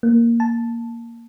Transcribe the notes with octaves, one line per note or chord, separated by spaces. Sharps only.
A#3
A5